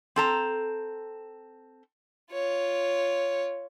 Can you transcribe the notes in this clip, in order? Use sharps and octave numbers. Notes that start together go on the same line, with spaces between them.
C4 A4 A#5
F4 C#5